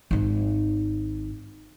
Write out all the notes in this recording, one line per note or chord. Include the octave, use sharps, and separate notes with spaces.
G#1 D#4